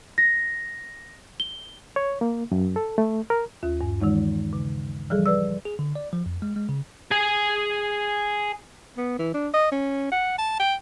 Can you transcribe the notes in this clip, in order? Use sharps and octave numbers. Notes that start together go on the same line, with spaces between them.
A#6
G7
C#5
A#3
F#2
A4
A3
A#4
D#2 F4
G2
D#3 E3 G#3 D#4
C#3
E3 F3 G3 G#4 A4
B4 D5 E6
G#4
D3
D5
F3
F2
G#3
G#3
C#3
G#4 G#5
B3
E3
D4
D#5
C#4
F#5
A5
G5